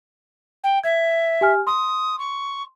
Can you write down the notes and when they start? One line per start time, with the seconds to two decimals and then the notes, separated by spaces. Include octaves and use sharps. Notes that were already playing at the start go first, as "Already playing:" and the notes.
0.63 G5
0.84 E5 G#6
1.41 G4 G#5 F6
1.67 C6 D#6
2.19 C#6